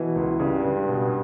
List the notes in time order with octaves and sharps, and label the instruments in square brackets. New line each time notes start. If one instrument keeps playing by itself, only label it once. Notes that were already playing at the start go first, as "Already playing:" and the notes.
Already playing: [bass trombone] B2 [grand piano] E3
[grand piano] C#2
[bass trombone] G2 [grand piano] C#3
[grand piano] C#3
B2